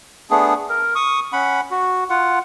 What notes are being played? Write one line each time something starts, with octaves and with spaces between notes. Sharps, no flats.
A3 B3 D4 G#4
A#4
C#6 D#6
C#4 F#5 B5
F#4
F4 F#5